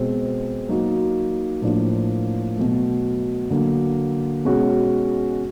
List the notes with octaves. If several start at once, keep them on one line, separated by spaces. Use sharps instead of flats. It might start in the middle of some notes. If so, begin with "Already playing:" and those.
Already playing: B2 G#3 C4
F#3 A#3 D#4 F#4
A2 F3 A#3 D4
B2 F#3 A3
D3 F#3 A#3
B2 G#3 C#4 F#4